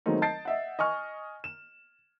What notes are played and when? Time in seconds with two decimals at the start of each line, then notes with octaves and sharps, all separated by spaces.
0.06 D#3 F#3 G#3 A3 C4 D#4
0.22 D#5 A5 G6 A6 C7 D7
0.45 D#5 E5 F#5
0.79 D#5 G#5 C#6 F6
1.44 E7